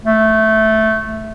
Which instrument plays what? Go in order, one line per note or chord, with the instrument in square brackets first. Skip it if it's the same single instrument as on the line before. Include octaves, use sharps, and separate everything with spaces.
[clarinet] A3